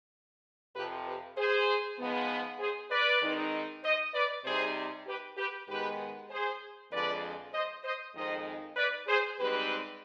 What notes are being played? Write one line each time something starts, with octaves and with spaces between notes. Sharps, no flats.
F2 C3 F3 C4 G4 B4
G4 B4
G#4 C5
G#2 F3 G#3 B3
G#4 C5
B4 D5
D#3 G#3 C4 D#4
C5 D#5
B4 D5
C3 G3 C4 D#4 G#4 C5
G4 B4
G4 B4
G#2 D#3 G#3 B3 G4 B4
G#4 C5
F2 D3 F3 G#3 B4 D5
C5 D#5
C5 D#5
F2 D#3 G#3 C4 D#4 C5 D#5
B4 D5
G#4 C5
G#2 G3 C4 D#4 G4 B4